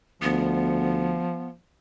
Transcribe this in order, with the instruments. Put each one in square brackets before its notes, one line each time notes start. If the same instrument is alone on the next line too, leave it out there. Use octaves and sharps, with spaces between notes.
[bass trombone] D2 [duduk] F3 [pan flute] B3